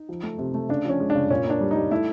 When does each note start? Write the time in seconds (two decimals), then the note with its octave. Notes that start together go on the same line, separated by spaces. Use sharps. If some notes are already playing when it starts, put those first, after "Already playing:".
Already playing: D#4
0.09 F3
0.23 A3
0.38 C3
0.54 A3
0.69 C#3 D4
0.85 F3 C#4
1.00 G#3
1.10 D4
1.15 C#3
1.30 A#2 C#4
1.45 A#3
1.50 D4
1.61 G3
1.71 G3 D#4
1.91 A3 E4